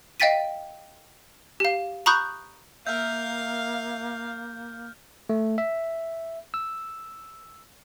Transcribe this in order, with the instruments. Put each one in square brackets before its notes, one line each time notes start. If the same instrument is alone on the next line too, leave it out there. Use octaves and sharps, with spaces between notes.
[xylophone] D#5 F5 G5 A6 B6 D#7
G4 F5
A#5 B5 C#6 D#6 F#6 G6
[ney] A#3 [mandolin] A#4 E5 [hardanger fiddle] F5 [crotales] F6 G6
[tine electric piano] A3
E5
E6